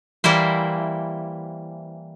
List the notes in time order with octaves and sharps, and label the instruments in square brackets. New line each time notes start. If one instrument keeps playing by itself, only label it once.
[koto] E3 G3 A#3 E4 C5